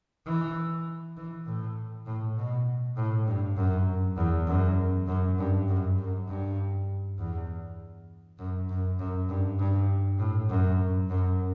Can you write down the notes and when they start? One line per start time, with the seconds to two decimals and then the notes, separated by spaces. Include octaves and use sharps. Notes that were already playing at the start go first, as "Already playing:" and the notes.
0.26 E3
1.17 E3
1.47 A2
2.06 A2
2.37 B2
2.97 A2
3.27 G2
3.57 F#2
4.17 E2
4.47 F#2
5.07 F#2
5.38 G2
5.68 F#2
5.98 F#2
6.28 G2
7.19 E2
8.39 F#2
8.69 F#2
8.99 F#2
9.29 G2
9.59 G2
10.19 A2
10.50 F#2
11.09 F#2